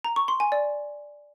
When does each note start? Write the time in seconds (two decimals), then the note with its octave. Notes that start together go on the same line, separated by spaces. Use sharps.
0.04 A#5
0.16 C#6
0.28 C6
0.40 G#5
0.52 D5